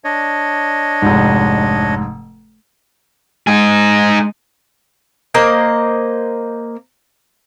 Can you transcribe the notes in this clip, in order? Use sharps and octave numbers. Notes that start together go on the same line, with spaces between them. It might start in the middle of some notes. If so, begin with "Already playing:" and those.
D4 C#5 D#5
F1 G#2
G#3 D#4 G#4
A#3 C5 D#5